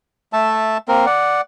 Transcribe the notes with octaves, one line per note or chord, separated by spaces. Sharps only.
A3 E5 A5
A#3 C4 A#4
D5 F#5